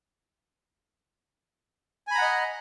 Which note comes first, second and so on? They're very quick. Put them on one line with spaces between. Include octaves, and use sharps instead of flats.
G#5 B5 A#5 F#5 D#5